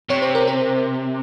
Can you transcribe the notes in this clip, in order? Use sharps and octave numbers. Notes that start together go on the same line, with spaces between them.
C3 C#5
C5
A#4
C5